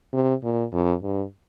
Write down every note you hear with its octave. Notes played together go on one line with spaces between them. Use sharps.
C3
A#2
F2
G2